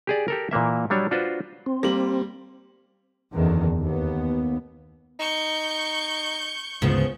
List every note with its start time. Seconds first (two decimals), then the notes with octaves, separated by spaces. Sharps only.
0.07 G4 G#4 D5
0.28 G4 A4 A#4
0.51 A#2 E3 A#3 E5
0.90 F#3 G3 D4 C#5
1.11 D4 F4 F#4 B4 C5
1.66 C4
1.83 G3 A#3 F#7
3.35 F#1 E2 D3 D#3
3.80 D#2 B3
5.20 D#4 C#6 G6
6.82 G#1 D2 G#2 C#3 F3 B3